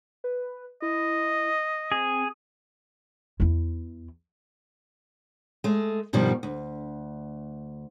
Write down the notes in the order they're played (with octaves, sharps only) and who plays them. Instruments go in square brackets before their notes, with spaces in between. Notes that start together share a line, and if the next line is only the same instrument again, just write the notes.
[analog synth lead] B4
[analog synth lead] E4 [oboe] D#5
[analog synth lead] C4 [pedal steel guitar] G#4
[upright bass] E2 E4
[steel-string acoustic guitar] G#3 A3
G2 B2 D#3 F3 G3
D2